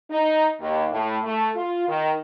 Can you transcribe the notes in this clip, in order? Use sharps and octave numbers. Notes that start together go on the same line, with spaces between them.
D#4
D#2
A2
A3
F4
D#3